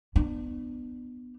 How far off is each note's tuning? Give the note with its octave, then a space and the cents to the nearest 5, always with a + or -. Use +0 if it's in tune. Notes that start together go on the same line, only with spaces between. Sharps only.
B3 +0 D4 +30